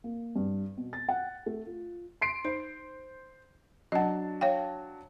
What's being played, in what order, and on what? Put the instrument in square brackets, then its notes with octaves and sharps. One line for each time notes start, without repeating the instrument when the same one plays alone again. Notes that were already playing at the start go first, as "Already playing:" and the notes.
[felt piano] A#3
G2
B2
A6
F#5
A3
F4
[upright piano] C6 C7 D7
[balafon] D#4 [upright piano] C5
[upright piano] F#3 D4 A5 [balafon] D#5 F#5
[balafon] C#5 F5 G5